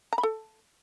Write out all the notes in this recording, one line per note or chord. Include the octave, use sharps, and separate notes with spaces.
A#5
B5
A4